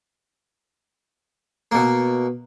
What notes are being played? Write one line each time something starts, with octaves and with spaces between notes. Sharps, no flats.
B2 A#3